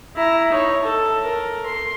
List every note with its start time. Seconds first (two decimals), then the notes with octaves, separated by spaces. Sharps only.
0.16 E4 A#5
0.52 D#4 C#5
0.83 A4
1.25 A#4
1.66 C6